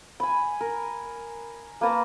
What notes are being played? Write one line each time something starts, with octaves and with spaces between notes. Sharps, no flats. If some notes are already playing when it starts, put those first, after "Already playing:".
G#5 B5
A#4
A#3 B4 A5 A#5